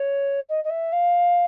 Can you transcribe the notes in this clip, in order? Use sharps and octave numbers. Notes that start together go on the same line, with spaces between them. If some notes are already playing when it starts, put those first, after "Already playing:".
Already playing: C#5
D#5
D#5
E5
F5